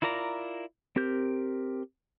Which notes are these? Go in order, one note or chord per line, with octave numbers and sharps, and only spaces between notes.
E4 F4 A#4 D5 A#5
C4 G4 A#4 G6